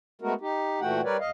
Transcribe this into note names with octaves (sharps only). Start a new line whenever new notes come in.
G#3 A3 B3 F#4 A#4
D#4 G4
A#2 E3 A3 F#4 F#5 G5
G3 A#4 B4 C#5 D5
E2 D#5 F5